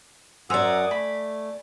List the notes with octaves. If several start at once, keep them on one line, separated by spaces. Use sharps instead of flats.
F#2 C5 D5 F#5 G#5 A#5 D#6 E6
A3 B5